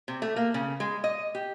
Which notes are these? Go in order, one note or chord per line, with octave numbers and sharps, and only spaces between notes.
C3
A3
A#3
C#3
G#3
D#5
G4